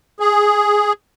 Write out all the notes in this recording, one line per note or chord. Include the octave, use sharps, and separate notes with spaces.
G#4